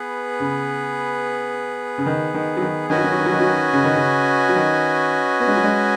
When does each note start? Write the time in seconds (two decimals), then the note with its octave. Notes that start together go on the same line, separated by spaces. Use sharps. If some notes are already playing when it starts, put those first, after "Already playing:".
Already playing: B3 G#4 B4
0.40 C#3
1.98 C#3
2.06 D#3
2.34 D#3
2.56 F#3
2.62 D#3
2.90 D#3 C#4 F#4 B4 D#5 G#5
2.97 F#3
3.04 D#3
3.11 F#3
3.18 D#3
3.26 F#3
3.32 D#3
3.40 F#3
3.47 D#3
3.73 C#3
3.84 D#3
3.95 C#3
4.49 F#3
4.56 D#3
5.40 B3
5.48 G#3
5.56 F#3
5.64 G#3